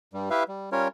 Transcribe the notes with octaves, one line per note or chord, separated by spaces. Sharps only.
G2 G3
E4 G4 B4 E5 F5
G3
G3 C#4 F4 A#4 C#5